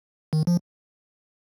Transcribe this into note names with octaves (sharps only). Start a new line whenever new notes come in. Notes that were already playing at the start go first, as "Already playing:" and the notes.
D#3
F3